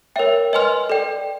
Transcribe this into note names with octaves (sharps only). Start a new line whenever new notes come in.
A#4 C#5 E5 G5
B4 D#5 G#5 C6 F6
A4 D5 G5